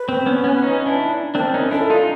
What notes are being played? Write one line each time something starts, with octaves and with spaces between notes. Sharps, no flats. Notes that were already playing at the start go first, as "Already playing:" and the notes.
Already playing: B4
C4
B3 C#4
B3 C#4
C#4 D#4
D4 E4
C4 D4 A#4
C#4 D#4
D4 E4 A4
D#4 F4